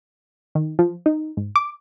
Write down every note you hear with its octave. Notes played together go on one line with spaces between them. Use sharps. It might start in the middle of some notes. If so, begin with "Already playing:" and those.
D#3
F3
D#4
G#2
D6